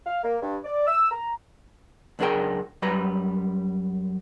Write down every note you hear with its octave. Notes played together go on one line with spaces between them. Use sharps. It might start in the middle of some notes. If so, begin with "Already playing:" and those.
F5
A#3
G2
D5
E6
A#5
C#2 F#2 D4 G#4 A#4 G5
F#2 G3 B4 A#5